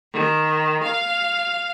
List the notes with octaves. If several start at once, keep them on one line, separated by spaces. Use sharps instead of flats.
D#3
F5